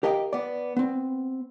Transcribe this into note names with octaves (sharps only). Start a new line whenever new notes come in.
G4 A#4 D#5 F5 G5
B3 D5
B3 C4